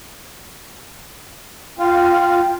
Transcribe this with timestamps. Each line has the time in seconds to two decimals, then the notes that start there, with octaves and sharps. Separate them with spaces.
1.79 F4 G5